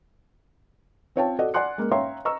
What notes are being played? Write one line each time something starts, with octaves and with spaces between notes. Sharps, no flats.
C4 F4 C#5 F5 G5 A5
F#4 A4 D5 D#5 F#5
D5 F#5 G#5 C6 F#6 C#7
G#3 A#3
C#5 E5 F5 G5 A#5 C6
D#5 A#5 C#6 E6